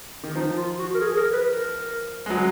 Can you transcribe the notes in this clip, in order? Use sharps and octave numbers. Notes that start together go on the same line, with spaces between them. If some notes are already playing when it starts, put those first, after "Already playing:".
D#3
F3 D#4
F4
F#4
A#4
G#4
G#4
A#4
B4
A#4
G#3
F#3